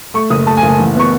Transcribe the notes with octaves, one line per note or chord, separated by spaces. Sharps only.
A3 C#6
F#1 D#6
A3 A5
G#5
F#1
G#5
A1
B3 C#6